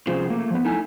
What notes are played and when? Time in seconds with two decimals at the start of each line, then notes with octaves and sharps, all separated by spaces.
0.07 C3 F3 C#4 F4 G#4 C5
0.30 A3 A#3
0.50 F3 B3
0.65 A3 D#4 E4 A4 G#5